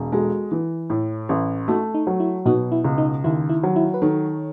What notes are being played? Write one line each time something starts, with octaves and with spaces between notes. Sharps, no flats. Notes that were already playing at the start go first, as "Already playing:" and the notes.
Already playing: E1
G#3 F#4 A4
E3
A2
A1
A3 D#4 F#4
D#4
F#3
E4
B2 D#4 F#4
E4
C#2
D#4
D#2 E4
E4
F#3
E4
B4
D#3 A4 C#5